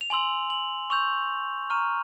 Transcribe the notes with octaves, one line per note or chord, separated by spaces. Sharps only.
F7
G#5 C6 E6 F#7
F#7
C#6 E6 G6 F7
A#5 C#6 F6 D#7